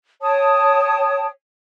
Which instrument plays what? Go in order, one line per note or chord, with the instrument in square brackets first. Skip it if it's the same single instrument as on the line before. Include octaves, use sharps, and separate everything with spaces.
[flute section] C#5 G5 A5 D#6